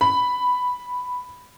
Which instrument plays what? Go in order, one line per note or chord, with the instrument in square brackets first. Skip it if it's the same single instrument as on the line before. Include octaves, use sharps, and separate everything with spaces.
[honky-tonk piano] B5